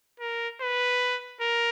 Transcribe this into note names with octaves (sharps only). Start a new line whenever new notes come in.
A#4
B4
A#4